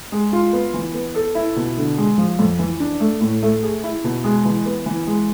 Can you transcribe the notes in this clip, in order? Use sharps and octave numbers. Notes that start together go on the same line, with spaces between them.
G#3
F4
B3
E3
B3
A4
E4
B2
D3
G#3
F3
F2
E3
D4
A3
A2
A3
G#4
E4
B2
G#3
E3
B3
E3
G#3